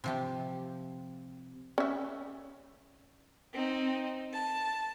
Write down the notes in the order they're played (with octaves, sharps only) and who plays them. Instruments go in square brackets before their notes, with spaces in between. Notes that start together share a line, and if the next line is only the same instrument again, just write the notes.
[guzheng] C3 F3 G4
[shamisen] C#4 E5
[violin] C4 D#4
A5